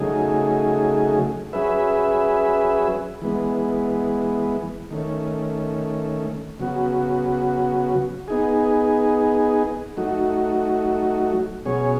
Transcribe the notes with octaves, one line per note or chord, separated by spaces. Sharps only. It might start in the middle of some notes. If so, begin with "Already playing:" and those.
Already playing: C#3 F#3 A3 D#4 G#4
F#3 C#4 G#4 B4 E5
E3 G#3 B3
D#3 A3 C#4
C#3 F#3 B3 F#4
B3 D#4 G#4
F#3 A3 D#4 F#4
B2 F#3 C#4 G#4 C#5